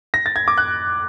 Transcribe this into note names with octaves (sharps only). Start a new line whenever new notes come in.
A#6
A6
G#6
D6
F#6